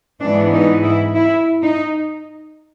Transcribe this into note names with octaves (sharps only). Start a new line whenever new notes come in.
G#2 E3 G#3 B3 D4
D#4
E4
E4
D#4